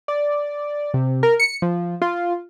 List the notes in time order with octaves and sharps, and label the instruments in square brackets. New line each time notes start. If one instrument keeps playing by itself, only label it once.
[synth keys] D5
C3
A#4
C#7
F3
F4